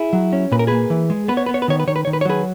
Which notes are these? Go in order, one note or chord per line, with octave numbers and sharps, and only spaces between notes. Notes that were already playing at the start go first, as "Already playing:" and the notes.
Already playing: E4 G#4
F#3
C#4
A#2 B4
A#4
A#3 G#4 B4
E3
G#3
B3 B4
C#5
B3 B4
C#5
B4
D#3 C#5
B4
D#3 C#5
B4
D#3 C#5
B4
C#5
F#3 G#4 B4